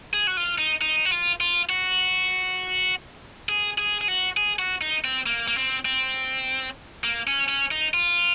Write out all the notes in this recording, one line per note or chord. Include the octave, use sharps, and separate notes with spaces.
G#4
F#4
F4
D#4
D#4
F#4
F4
F4
F#4
G#4
G#4
G#4
F#4
G#4
F#4
D#4
C4
A#3
A#3
C4
C4
A#3
C#4
C#4
D#4
F4